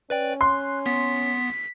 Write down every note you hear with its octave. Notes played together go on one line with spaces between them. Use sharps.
C#4 B4 D5 G5
C6 F#6
B3 B6